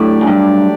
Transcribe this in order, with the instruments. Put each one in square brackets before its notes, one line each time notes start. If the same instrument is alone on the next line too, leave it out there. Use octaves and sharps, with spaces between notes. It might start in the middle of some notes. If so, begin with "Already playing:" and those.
Already playing: [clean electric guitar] A2 [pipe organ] F#3 A3 D4 G4 D5
[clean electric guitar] F#2
G2